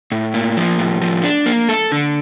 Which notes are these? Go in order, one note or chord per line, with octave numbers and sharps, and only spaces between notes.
A2
A#3
F3
A2
F3
D4
A#3
A4
D3